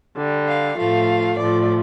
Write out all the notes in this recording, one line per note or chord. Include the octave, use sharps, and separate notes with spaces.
D3 G3
F5
A2 F3 A3 F5
A2 F3 A3 D5